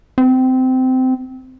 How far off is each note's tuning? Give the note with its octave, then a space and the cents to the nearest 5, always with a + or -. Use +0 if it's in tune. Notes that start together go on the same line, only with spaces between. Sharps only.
C4 -20